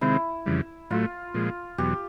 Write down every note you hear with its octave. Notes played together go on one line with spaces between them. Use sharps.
C3 D#3 G#3 C4 E4
F2 C#3 E3 G3
A2 F#3 A3 F4
A#2 F3 G#3
E2 B2 F#3 G4